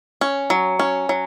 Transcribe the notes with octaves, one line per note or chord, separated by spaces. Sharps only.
C#4
F#3
C#4
F#3